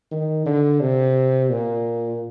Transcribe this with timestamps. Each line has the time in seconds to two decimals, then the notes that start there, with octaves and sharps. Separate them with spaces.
0.11 D#3
0.46 D3
0.81 C3
1.50 A#2